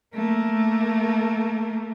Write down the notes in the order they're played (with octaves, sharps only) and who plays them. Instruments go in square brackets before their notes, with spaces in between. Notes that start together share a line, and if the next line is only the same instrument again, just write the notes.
[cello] A3 A#3